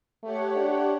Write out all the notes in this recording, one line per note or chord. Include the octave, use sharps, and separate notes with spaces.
A3 G4 C#5 F#5
D4